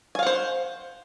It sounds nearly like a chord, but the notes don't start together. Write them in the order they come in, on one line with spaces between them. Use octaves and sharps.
G#5 F5 F#5 C5